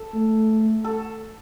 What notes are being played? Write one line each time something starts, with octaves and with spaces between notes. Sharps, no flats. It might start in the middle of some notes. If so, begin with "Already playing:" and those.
Already playing: A4
A3
A4